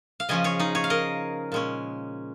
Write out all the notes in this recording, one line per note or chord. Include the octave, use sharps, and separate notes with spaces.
F5
C#3 F3 C#4 D#5 G#5
G#4 C#5
D#4 G#4
G#4 C#5
F5
A#4 D#5
A#2 G#3 C#4